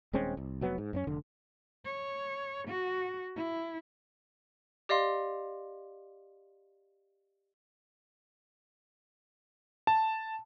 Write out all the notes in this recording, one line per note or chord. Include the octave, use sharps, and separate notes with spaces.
D#1 G#3 C4 C#4
C2
F1 F#3 B3
G#2
F#2 C4 C#4
F1 D3
C#5
F#4
E4
G4 D5 D#5 F5 C6
A5